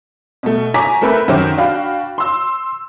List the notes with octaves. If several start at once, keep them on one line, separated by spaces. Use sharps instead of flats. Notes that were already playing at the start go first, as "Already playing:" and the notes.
B2 A3
C#5 G#5 A#5 D6 B6
A3 C4 A#4 B4 E5
F#2 D#3 F#3 C5 G5 D6
D4 F#4 F5 G5 B5
C6 E6